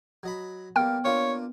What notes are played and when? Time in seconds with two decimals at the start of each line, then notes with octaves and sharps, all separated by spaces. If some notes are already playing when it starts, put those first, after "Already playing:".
0.23 F#3 D#5 B5
0.76 G3 A#3 B3 G5 F6
1.05 A#3 D4 F4 C#5